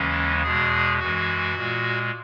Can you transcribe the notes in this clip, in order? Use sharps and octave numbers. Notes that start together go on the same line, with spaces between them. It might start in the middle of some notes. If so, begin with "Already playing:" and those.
Already playing: D#2 C#3 E3 G#3 C#4
E2 B2 G#3 G#4
F#2 E3 G#3 F#4
A#2 G#3